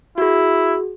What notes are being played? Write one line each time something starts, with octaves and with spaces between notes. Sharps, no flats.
E4 F#4 G#4